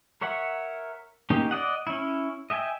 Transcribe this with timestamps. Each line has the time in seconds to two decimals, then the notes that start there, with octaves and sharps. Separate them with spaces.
0.21 A#4 C#5 E5 F#5
1.30 A#3 C#4 D#4 G4
1.51 D5 D#5 F#5
1.87 C#4 E4
2.50 D#5 E5 G5 G#5